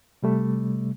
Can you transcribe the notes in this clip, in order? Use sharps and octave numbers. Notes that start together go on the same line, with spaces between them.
C3 G3 A3